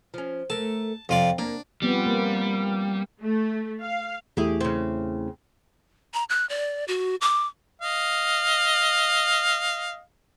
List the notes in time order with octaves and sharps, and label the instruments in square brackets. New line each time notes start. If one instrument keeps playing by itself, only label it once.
[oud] F3 C#4
[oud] A3 A#4 [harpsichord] A5
[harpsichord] F2 F4 D5 [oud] C3
[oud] A#3 [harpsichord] D4
[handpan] F3 B3 C4 [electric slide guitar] G3
[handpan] A#3
[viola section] A3
F5
[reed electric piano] E2 A3 E4 [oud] G4 G#4
[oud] C#3 C4
[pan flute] A#5
F#6
D5
F#4
D6
[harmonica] D#5 F5